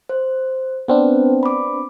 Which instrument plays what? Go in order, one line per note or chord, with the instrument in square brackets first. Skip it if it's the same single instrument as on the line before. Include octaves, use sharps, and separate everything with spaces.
[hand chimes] C5
[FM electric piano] B3 C4 D4 [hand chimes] B4 C5
[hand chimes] B5 D6